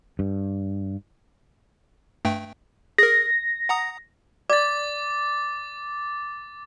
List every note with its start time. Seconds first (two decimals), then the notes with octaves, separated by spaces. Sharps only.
0.19 G2
2.25 G2 A3 G5
2.98 G#4 A#4 A#6
3.69 F#5 A#5 D#6
4.50 D5 D6 A6